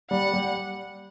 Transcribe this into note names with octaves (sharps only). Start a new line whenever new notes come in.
G3 F#5
G3